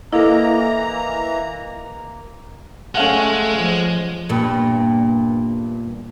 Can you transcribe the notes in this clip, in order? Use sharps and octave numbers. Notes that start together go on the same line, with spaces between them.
E3 A#3 E4 A4 D#5 A#5
G#3 A3 C#4 F5 F#5
F3
E2 G2 A#2